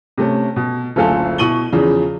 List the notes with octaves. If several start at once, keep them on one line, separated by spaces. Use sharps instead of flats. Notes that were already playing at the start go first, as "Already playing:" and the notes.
C3 A3 C#4
B2
F#1 D2 F4 A4 F5 G#5
B2 E4 C#6 D#7 F#7 G7
E2 C#3 F3